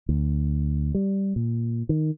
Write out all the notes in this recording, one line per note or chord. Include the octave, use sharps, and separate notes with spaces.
D2
G3
A#2
D#3